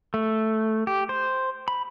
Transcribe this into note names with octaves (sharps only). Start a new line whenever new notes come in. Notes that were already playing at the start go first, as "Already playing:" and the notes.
A3
G4
C5
B5